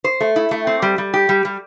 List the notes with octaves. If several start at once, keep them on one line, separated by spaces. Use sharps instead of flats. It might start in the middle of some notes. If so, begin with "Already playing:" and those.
C5
A3
E4
A3
C4
G3
G3
G4
G3
G3